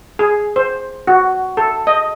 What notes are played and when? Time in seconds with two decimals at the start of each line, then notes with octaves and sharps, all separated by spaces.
0.19 G#4
0.56 C5
1.07 F#4
1.57 A4
1.87 D#5